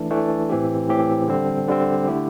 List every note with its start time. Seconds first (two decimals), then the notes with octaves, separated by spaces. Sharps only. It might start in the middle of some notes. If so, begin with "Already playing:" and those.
Already playing: E3 A3 D4
0.10 E3 A3 D4
0.49 A2 E3 C4 G4
0.89 A2 E3 C4 G4
1.28 D3 G3 C4
1.68 D3 G3 C4
2.07 D3 A3 E4 G4